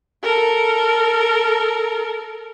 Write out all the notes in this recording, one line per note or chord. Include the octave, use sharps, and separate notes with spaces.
A4 A#4